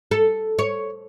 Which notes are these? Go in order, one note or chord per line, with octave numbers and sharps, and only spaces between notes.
A4
C#5